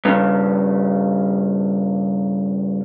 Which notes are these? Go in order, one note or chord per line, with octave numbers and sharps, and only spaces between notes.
G2 C#3